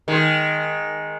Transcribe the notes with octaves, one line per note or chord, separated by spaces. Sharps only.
D#3 G#3